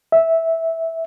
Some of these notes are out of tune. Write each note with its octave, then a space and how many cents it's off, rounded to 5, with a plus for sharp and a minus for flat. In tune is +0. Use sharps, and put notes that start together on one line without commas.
E5 -10